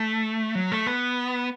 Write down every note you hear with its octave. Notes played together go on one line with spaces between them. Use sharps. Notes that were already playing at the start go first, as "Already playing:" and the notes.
Already playing: A3
F#3
A3
B3